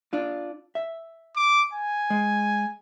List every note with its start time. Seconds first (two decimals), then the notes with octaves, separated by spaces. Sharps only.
0.13 D4 F4
0.75 E5
1.36 D6
1.74 G#5
2.10 G#3